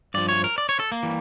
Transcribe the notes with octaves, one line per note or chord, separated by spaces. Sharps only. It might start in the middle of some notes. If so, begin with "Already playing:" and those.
G2 F3 D5
C#5
A#4
D5
C#5
A4
A#3
E3 G3